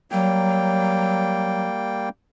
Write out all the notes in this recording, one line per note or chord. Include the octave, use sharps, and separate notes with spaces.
F#3 G3 A#3 G5